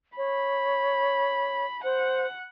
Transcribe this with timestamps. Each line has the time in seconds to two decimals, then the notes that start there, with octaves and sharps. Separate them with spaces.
0.17 C#5 B5
1.84 C5 F#5